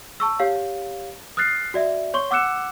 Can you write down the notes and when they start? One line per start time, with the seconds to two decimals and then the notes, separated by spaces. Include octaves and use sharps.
0.20 A5 C#6 E6
0.39 G4 C#5 F5
1.37 D#6 F6 F#6 A6 C7
1.74 F#4 D5 E5
2.14 C#5 C6 C#6 G7
2.31 F#5 D6 E6 F#6 C#7 E7